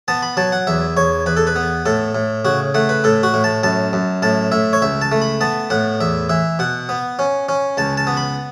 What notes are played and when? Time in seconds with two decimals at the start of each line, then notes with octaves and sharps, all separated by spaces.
0.08 B3 A5
0.23 B5
0.37 F#3 A5
0.52 F#5
0.67 E2 E5
0.97 E2 C#5
1.26 E2 B4
1.37 A4
1.47 B4
1.56 B3
1.86 A2 A4
2.15 A2
2.45 C#3 F#4
2.74 A3 F#5
2.89 B4
3.04 A2 A4
3.23 F#4
3.34 A2
3.44 A5
3.63 F#2 A5
3.93 F#2
4.22 A2 A5
4.52 A2 E5
4.73 C#5
4.82 C#2 E5
5.02 A5
5.12 A3
5.22 B5
5.41 B3 A5
5.70 A2 F#5
6.01 E2 E5
6.29 E3 E5
6.59 B2 F#5
6.89 B3
7.19 C#4
7.49 C#4
7.77 C#2 A5
7.97 A5
8.07 B3
8.17 B5